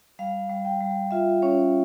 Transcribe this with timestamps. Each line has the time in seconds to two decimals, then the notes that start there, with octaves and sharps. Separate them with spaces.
0.19 G3 F5
0.50 G3
0.65 G5
0.81 G3
1.11 F4 E5
1.42 C#4 C#5